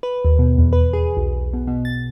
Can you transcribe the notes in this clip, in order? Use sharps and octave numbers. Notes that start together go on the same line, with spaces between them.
B4
D#2
B2
E2
B4
G#4
B1
B2
B2
A6